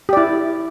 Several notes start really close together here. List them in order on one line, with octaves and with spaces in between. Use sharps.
G4 D5 E4